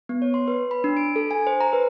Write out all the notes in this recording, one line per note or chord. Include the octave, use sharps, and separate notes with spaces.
B3
C#5
C6
B4
B5
D4
D7
A4
G#5
C5
A#5
B4